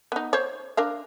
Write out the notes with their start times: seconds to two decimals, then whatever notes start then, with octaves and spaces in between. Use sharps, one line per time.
0.12 B3 D#4
0.33 C5 C#5
0.77 D4 A#4 F5